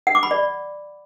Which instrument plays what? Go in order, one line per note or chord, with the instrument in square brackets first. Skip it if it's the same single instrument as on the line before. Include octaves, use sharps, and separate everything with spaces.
[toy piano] F#5
D6
B5
D5